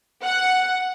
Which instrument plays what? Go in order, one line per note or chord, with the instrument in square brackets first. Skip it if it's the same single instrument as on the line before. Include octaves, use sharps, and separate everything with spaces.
[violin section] F#5